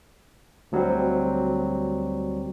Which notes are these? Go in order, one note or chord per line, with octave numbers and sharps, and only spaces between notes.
D2 F#3 G3 C4